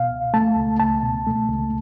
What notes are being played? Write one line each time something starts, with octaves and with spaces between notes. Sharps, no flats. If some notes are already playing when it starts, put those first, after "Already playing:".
Already playing: B2 F5
C#2
A3 A5
C#2
C#2 A5
B2
A3
C#2